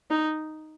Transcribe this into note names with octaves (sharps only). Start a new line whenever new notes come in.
D#4